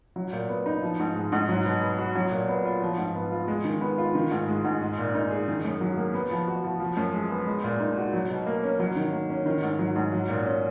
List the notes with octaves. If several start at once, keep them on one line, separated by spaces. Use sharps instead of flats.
F#3
A#2
B3
D#4
F3
G#2
G#3
G#2
F#3
B2
B3
F#4
F#3
A#2
B3
F4
F3
G#2
B3
F4
G#3
D#3
B3
F4
D#3
G#2
G#3
G#2
G#3
A#2
D#4
G#4
D#3
F#2
F#3
A#3
B3
F3
F#4
F3
F3
F#2
G#3
B3
G#3
A#2
D#4
F#4
F#3
B2
A#3
C#4
F#3
D#3
A#3
C#4
D#3
G#2
F#3
G#2
F#3
A#2
C#4